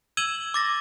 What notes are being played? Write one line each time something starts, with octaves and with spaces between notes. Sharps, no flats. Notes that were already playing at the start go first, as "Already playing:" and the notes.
E6 G#6 D#7 E7 F#7 G7
D6 A6 A#6